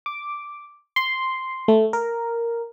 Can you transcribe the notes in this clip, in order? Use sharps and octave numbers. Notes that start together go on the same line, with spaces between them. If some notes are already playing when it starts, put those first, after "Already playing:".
D6
C6
A3
A#4